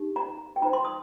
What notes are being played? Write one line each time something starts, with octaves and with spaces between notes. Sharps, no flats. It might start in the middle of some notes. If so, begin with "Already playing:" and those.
Already playing: D#4 G4
A#5
G5
D#4 C5 A#5
C6
D#6